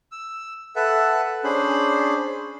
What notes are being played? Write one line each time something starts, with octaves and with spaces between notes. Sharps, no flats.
E6
A4 B4 E5 F#5
C#4 D4 G#4 C5 B5